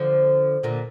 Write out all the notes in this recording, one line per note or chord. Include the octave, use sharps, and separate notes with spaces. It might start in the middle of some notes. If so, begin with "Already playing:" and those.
Already playing: D3 F3
A#2 D3